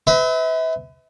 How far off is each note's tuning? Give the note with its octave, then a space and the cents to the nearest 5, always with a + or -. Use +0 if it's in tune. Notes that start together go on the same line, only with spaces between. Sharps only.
B4 +30 E5 -35